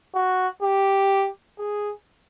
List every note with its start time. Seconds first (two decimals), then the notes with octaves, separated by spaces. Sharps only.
0.15 F#4
0.62 G4
1.59 G#4